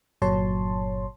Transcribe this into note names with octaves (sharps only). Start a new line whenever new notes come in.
G1 A#2 F#3 C#5 A5 C6